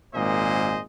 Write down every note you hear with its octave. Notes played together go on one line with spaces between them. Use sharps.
G#1 A#2 G#4 C5 D#5